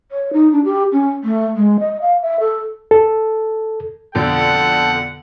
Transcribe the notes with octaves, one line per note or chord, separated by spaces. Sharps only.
C#5
D#4
D4
G4
C#4
A3
G#3
D#5
F5
E5
A4
A4
F2 B2 D3 A4 F#5 A5 G6